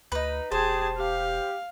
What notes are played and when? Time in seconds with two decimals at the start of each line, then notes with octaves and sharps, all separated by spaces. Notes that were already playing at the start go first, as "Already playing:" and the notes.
0.12 D2 D#4 B4
0.52 E1 G4 G#4 C5 A5
0.98 G4 F5